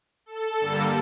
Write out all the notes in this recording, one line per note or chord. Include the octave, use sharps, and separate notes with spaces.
A4
G2 D3 G3 A#3